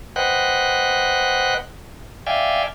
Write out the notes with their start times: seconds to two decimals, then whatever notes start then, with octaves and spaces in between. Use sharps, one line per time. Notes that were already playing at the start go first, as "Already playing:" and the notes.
0.16 B4 C5 D#5 F#5 G5 F#6
2.27 D5 E5 F5 G5 G#5